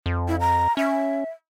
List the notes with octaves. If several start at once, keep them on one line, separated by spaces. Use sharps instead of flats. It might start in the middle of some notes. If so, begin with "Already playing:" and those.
F2
E4
A#5
C#4 E5